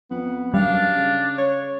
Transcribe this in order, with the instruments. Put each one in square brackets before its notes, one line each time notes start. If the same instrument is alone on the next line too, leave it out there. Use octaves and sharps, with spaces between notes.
[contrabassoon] F2 [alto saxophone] B3
[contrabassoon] F#2 [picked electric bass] G3 [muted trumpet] D4 [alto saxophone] F5
[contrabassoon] C#3
[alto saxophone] C#5